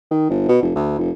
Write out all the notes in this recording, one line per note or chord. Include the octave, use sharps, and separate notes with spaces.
D#3
G1
B2
F1
D2
F1